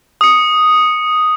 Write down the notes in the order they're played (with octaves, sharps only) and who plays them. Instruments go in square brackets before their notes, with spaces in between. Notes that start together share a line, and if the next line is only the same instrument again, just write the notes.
[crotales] D#6 C#7